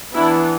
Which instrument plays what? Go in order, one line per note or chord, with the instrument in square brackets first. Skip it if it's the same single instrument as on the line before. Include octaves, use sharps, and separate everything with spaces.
[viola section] E3 B3 D4 E4